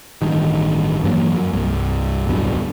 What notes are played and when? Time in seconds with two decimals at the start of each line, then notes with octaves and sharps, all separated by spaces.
0.22 A1 G2 D#3
1.03 G2 E3 F#3 A#3
1.36 F#2
1.53 C2 G2
2.27 D1 B1 G2 B2